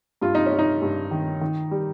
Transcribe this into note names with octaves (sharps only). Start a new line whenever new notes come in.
G2 F4
D#4
C#4
G3
D#4
G2
D#3
D#3
G3